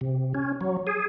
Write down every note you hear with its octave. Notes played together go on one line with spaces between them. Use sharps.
C3
C#4
F#3
G#4